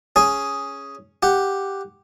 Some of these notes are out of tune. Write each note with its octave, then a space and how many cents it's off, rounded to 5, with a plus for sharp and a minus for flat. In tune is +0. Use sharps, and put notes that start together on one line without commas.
C#4 +0 G#4 +0
G4 +0 F#5 +0